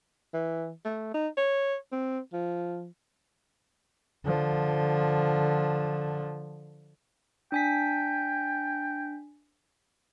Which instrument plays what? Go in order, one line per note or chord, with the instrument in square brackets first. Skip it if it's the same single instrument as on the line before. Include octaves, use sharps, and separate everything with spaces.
[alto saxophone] E3
A3
D#4
C#5
C4
F3
[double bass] D3 F3
[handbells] D4 G#5 B6 [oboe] G5